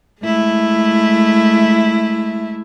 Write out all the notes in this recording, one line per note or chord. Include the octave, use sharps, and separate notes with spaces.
G#3 A3 E4